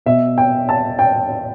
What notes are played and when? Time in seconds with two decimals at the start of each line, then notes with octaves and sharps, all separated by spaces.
0.06 B2 E5
0.38 G5
0.69 A5
0.99 G5